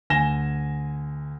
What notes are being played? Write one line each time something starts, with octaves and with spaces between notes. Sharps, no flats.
D2 G#5 A#6 E7 G7